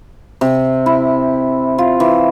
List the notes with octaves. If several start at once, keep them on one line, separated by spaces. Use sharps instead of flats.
C3
E4
F4
E3